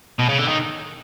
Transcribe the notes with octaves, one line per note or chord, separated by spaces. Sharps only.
B2
C#3
D3
D#3